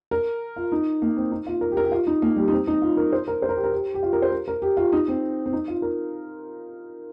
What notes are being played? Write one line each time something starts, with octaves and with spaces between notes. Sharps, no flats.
A#4
F4
D#4
A#3
C4
D#4
F4
A#4
G4
A#4
G4
F4
D#4
A#3
G3
D#4
C4
D#4
F4
A#4
C5
A#4
C5
A#4
G4
A#4
G4
G4
F4
A#4
C5
A#4
A#4
G4
F4
D#4
C4
C4
D#4
F4
A#4